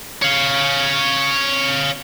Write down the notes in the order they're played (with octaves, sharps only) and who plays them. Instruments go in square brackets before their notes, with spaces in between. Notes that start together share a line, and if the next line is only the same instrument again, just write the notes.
[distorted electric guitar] C#5 F5